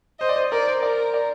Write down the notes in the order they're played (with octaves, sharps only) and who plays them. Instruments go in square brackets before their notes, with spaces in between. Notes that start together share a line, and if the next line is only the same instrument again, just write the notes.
[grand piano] C5 [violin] D#5
[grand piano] D5
C5
[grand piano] A#4 [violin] D5
[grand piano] C5
[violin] A#4 [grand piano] D5
[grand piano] D5